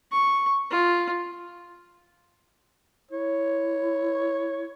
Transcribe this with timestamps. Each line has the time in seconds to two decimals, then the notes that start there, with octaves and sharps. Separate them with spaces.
0.11 C#6
0.70 F4
3.11 E4 C#5